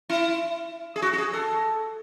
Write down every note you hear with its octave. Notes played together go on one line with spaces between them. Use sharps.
E4
G#4
F#4
F#4
G#4
A4